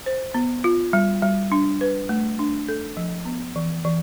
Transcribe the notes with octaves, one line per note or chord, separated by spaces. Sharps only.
C5
B3
F4
G3
G3
D4
B4
A3
D4
A4
F3
B3
E3
E3